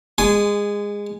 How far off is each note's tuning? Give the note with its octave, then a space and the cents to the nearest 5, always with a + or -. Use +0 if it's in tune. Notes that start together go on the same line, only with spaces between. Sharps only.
G#3 -20 G#5 +0 C6 -25